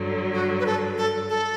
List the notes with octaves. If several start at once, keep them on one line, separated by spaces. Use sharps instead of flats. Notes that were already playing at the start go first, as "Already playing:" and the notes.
Already playing: G2 D3 F#3
F#4
B4
A4
A4
A4